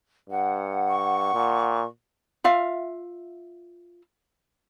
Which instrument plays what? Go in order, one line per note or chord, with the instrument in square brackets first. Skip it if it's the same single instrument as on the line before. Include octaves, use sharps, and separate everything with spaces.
[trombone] G2 [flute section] F#5
[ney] C#6
[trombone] A#2
[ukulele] F4 E5 F5